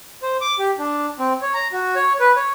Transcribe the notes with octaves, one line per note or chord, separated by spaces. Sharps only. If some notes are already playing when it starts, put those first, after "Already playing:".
C5
D6
G4
D4
C4
C#5
A#5
F#4
C#5
B4
C#5